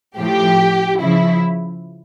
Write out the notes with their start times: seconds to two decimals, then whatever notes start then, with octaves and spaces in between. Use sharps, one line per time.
0.18 A2 F3 G4
1.00 C#3 F3 E4